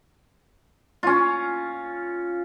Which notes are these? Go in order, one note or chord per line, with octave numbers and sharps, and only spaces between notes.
C#4 F4